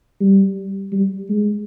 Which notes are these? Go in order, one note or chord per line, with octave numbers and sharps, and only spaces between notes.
G3
G3
G#3